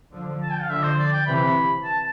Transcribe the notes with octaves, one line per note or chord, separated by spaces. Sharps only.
D3 F3
A5
G5
F5
D3 F3 E5
C5
D5
G5
C3 E3 B5
A5